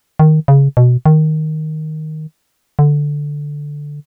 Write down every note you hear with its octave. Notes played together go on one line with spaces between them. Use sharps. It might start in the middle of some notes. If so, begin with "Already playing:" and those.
D#3
C#3
B2
D#3
D3